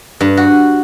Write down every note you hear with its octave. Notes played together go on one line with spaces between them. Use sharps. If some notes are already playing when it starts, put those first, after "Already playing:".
G2
F#4